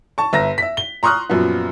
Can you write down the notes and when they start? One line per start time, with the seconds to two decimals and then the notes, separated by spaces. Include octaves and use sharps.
0.18 A5 C#6
0.33 G1 E5 A#5 A#6
0.58 E5 B6
0.77 G7
1.03 A#5 C6 C#6 D#6 F6 F#6
1.30 F#2 A#2 F3 B3